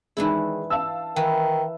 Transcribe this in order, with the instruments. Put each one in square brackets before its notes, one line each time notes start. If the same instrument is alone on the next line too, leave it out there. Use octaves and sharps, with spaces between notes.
[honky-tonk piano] D#3 G#3 [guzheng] E3 D4 E4
[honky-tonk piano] F5 A5 E6
[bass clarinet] D#3 [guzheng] E3